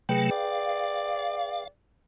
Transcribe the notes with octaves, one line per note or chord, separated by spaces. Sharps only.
C3 F#3 A3 G#4 B4 G5
D5 F5